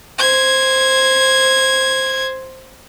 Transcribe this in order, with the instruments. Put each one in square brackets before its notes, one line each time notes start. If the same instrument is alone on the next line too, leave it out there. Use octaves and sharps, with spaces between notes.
[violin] C5 G#6